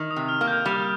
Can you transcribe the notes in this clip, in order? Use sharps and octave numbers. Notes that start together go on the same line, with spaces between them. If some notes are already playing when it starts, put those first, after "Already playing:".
Already playing: D#3
D#6
C3
F6
A#3
G6
G3